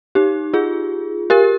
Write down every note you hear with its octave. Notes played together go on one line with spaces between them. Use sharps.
D#4 G4
F4 G#4
G4 A#4